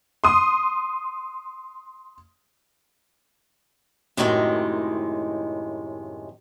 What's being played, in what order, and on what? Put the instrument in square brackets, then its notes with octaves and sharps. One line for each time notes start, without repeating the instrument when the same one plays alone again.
[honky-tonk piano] C6 D#6
[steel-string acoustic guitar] F#2 A2 C3 D#3 G#3